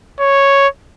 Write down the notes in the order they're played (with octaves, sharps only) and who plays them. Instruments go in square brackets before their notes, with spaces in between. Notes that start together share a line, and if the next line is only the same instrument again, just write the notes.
[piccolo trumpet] C#5